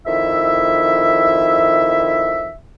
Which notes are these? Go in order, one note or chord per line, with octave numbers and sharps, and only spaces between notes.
F2 D#3 E4 E5